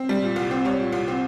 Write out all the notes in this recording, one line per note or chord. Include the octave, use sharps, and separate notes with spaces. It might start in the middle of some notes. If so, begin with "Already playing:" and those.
Already playing: C4
G3
A#2
C2
C4
G3 C#5
A#2
C2
C4